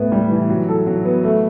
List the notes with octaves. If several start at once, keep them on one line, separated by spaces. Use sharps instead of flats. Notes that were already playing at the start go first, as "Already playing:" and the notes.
Already playing: A2 B3
G3
E3
F#3
A4
F#3
B3
A3